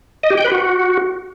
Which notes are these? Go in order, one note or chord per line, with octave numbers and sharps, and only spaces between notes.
D#5
G4
G5
B4
F#4